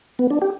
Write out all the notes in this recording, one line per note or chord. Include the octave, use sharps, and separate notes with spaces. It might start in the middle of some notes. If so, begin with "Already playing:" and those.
B3
D4
G4